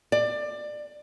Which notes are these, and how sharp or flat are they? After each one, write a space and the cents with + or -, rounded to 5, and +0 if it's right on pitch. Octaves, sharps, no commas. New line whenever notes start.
D5 +20